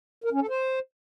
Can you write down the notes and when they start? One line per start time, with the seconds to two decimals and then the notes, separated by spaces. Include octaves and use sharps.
0.24 A#4
0.33 C#4
0.41 A4
0.49 C5